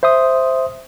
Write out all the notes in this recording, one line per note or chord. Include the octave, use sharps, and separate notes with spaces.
C5 E5 C6 D#6